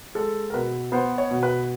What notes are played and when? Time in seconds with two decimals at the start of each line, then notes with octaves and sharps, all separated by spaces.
0.15 G#3 A4
0.50 A#4
0.53 B2 B4
0.92 B3 C5
1.18 C#5
1.30 B2
1.43 B4